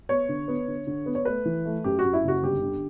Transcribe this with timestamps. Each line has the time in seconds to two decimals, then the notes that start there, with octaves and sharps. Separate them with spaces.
0.09 B3 C#5
0.29 D3
0.48 B3
0.68 D3
0.87 D3
1.06 B3
1.15 C#5
1.25 A3 B4
1.45 E3
1.65 A3
1.84 F#2 G4
1.99 F#4
2.04 F#2
2.13 E4
2.23 F#1 F#4
2.43 G1 G4
2.62 D3